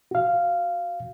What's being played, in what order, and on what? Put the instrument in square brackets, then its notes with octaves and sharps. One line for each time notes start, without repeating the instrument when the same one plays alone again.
[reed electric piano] F#4 F5